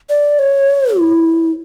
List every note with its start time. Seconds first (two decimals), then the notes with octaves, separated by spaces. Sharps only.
0.09 D5
0.39 C#5
0.98 E4